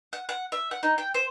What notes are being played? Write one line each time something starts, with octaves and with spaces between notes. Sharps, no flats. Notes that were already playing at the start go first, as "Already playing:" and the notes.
F#5
F#5
E5
F#5
D#4
G5
C5